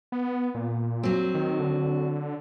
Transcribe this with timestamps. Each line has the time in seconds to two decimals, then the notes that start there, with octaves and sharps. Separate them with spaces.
0.12 B3
0.55 A#2
1.03 F#3 C4
1.34 D#3
1.59 D3